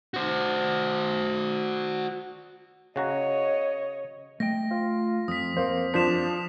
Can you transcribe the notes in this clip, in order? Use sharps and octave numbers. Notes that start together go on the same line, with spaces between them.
F#4 C5
C#3 F#4 C#5 D#5 A#5
A3 D#5 G5 A#6
F4
F2 D#6 B6
F2 A#3 C5
F3 D4 C5 B6 E7 F7